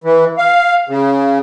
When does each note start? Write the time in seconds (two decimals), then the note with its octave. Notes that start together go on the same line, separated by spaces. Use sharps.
0.04 E3
0.38 F5
0.89 C#3